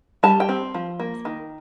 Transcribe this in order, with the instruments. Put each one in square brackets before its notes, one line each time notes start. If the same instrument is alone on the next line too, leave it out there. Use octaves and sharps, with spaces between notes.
[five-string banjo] G3 A5
G5
C4
F3
A#3
D#3